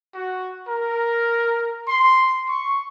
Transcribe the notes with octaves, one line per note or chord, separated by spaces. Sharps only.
F#4
A#4
C6
C#6